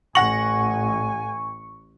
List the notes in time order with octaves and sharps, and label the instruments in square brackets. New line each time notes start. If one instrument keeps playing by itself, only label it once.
[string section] A1 [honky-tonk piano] F#5 A#6 F#7 [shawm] G#5 [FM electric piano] C#6